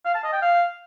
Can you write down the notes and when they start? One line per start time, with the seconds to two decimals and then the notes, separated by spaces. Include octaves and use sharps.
0.05 F5
0.14 A5
0.24 D#5
0.33 G5
0.42 F5